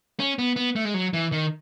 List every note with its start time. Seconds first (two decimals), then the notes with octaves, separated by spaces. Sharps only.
0.20 C#4
0.39 B3
0.56 B3
0.76 A3
0.85 G#3
0.94 F#3
1.13 E3
1.32 D#3